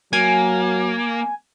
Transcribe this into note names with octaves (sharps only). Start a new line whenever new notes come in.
F#3 A#3 G#5